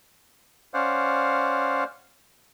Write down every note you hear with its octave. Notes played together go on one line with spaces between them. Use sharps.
C#4 C5 D5 F5 F#5